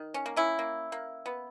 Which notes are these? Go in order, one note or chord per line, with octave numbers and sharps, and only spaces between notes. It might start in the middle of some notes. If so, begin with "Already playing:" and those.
Already playing: D#3
C#4
A#3
C#4 E4
A#3
A#3
B3